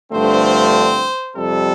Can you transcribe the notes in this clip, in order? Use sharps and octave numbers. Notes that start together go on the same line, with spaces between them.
G2 D3 F3 A3 C4 C5
F2 C3 G3 A4